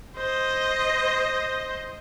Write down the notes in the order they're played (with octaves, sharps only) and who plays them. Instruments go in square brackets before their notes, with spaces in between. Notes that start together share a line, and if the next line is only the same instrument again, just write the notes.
[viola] C5 D#5